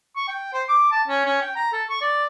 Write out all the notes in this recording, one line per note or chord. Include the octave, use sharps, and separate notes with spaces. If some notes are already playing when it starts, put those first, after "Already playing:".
C#6
G5
C5
D6
A5
C#4
C#4
G5
A#5
A4
C#6
D5